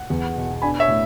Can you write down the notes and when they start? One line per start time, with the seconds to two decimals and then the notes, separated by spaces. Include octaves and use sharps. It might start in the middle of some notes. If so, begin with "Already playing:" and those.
Already playing: F#5
0.10 E2
0.36 B2
0.62 D4 G#5 B5
0.79 C#5 E5
0.88 A2